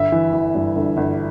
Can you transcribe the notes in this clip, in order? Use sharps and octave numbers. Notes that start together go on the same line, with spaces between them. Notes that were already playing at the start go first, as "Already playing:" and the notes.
Already playing: G1 E5
E3
E3
G2
G1
G1